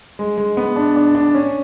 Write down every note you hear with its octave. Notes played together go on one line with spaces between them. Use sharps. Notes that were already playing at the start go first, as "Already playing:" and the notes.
G#3
G#3
B3
D4
D4
D4
C#4